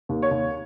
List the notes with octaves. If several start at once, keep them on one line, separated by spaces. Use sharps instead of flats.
D#2
C#5
D#2